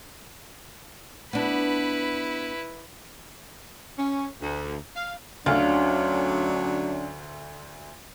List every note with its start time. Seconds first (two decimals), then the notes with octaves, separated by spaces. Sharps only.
1.33 B3 D4 E4 B4
3.98 C#4
4.41 D2
4.95 F5
5.46 D2 D3 F#3 C#4 D4 F4